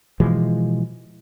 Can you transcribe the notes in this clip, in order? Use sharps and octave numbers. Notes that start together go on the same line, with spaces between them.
B2 E3 F3 G#3